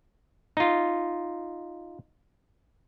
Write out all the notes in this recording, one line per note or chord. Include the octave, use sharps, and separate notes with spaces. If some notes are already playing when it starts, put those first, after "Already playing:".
D#4 F4